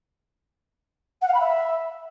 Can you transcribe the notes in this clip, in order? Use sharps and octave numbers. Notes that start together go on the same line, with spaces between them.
F#5
F5
B5
E5